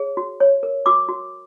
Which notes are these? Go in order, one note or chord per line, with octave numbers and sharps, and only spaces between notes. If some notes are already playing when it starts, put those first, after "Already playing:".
Already playing: G#4 C#5
F#4
C#5
A#4
F#4 D6 E6
F#4